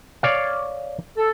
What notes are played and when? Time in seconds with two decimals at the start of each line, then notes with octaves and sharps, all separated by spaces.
0.23 C#5 D5 F5
1.17 A4